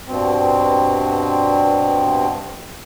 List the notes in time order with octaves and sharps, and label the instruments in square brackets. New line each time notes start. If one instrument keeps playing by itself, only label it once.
[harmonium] G2 B2 C4